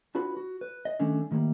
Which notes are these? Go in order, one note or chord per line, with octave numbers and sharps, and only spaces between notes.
D4 F4 F#4 B4 B5
F#4
B4
D#5
D#3 G3 A3 C#4 D4
A2 D#3 G3 A3 A#3